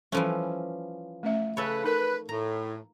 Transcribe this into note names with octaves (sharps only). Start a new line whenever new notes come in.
E3 F3 G3 C#4 A4
A3 C#4 E5
C#3 A4 B4 C#5
D#4 A#4 B4
A2 A#5